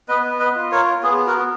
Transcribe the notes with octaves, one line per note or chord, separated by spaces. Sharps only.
B3 B4 D#5
B4 D#5
F4
A#4 C#5
B3 G#4
F#4 A#4